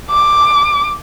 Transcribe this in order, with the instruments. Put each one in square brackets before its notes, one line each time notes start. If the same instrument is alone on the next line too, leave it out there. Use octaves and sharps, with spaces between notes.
[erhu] D6